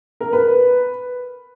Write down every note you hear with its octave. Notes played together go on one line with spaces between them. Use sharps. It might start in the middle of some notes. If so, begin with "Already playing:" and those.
A#4
B4